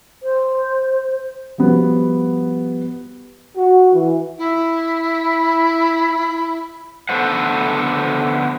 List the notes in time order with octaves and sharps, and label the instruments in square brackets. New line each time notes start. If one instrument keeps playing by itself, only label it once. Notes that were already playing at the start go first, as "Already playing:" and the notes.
[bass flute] C5
[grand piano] F3 G3 B3 F#4 B4
[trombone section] F#4
E3
[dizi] E4
[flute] B5
[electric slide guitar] D3 B3 A4 B4 C5 F#5